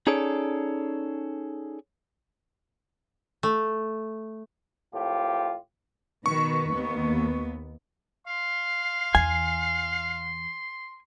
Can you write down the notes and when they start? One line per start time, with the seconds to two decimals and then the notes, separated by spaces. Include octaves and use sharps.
0.07 C#4 D#4 G#4 A4 C#5 D5
3.43 A3
4.93 G#1 A2 F4 G4
6.26 B2 D#3 B4 C#6
6.71 D#2 B3
8.27 F5 C6
9.15 E2 E3 G#5